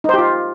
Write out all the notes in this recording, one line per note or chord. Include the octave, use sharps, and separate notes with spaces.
D#4 F4 G4 C5